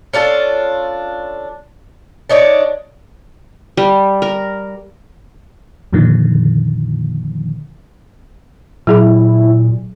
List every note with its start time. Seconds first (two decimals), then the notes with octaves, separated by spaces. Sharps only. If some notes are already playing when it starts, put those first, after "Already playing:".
0.13 C#4 D4 F4 A4
2.29 D4 D#4 C#5 D5
3.77 G3
4.22 A#4
5.93 F2 A#2 D3 D#3 F3
8.87 A#2 F#3 E4 G#4 E5